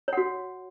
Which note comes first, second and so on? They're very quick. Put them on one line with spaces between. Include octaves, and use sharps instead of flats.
C#5 F#5 F#4